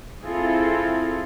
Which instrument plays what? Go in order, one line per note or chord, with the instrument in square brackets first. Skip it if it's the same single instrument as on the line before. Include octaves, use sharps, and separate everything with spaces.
[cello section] C4 E4 F4 G#4 A4